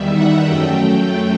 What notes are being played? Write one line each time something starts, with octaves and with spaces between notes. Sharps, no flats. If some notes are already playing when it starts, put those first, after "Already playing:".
Already playing: E2 D#3 G3 E5
F#5
F#2 F#3 A3 G5
G5